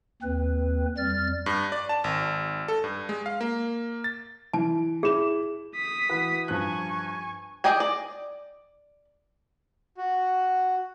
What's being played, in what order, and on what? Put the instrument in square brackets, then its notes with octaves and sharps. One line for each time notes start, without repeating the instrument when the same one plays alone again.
[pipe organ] D#2 C4 B4
F2 G3 F6 A6
[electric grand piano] G2
D5
A5
G#1
A4
G2
G#3
F5
A#3
A6
[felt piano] E3 [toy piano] A5
[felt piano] E4 E7 [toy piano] G#4
[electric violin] D#6 B6
[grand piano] E3 F#4 B4
[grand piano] G2 F3 F#6 [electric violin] G#5 C#6
[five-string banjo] G#4 D5 D#5 G5 G#5
D5
[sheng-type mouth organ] F#4